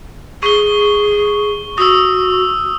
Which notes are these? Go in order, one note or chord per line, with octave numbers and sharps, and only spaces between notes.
G#4 C#6 G7
F#4 D#6 E6